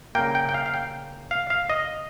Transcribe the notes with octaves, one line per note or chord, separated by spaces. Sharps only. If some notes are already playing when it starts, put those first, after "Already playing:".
C#3 G3 A#3 G5
G5
G5
F5
F5
G5
F5
F5
D#5